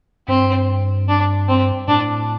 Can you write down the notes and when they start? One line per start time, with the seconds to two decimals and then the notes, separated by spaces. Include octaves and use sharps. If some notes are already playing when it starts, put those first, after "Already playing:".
0.28 G2 C4
1.08 D4
1.49 C4
1.88 A2 D4